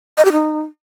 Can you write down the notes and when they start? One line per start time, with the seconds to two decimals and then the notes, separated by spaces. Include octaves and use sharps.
0.18 D#5
0.25 G4
0.32 D#4